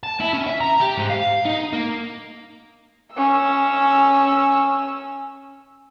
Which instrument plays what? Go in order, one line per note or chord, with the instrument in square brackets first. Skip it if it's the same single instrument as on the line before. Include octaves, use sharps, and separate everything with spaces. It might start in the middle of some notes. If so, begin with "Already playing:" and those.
[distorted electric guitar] A5
E4
C#4
E5
A#5
G4
G#2
F5
D#4
A#3
[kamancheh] C#4 E6